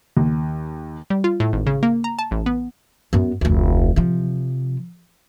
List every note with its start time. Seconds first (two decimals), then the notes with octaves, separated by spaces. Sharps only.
0.17 D#2
1.10 G3
1.24 F4
1.40 A2
1.53 G#1
1.66 C#3
1.83 A#3
2.04 A#5
2.19 A5
2.31 A1
2.46 B3
3.13 F#2 B3
3.41 F1 D2
3.96 C3 F3